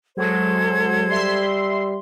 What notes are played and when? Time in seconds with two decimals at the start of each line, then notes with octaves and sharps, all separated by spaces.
0.17 F#3 G#3 A4 C5 G#6
1.09 G3 E5 C6